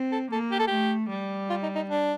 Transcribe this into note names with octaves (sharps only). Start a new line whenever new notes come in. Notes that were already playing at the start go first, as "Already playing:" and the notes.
Already playing: C4
A4
A#3 A4
G4
A4
A3 G4
G3
F4
D#4
D#4
D4